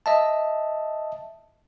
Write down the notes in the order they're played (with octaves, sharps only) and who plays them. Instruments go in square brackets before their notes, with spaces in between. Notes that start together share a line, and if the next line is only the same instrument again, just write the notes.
[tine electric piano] D#5 E5 A5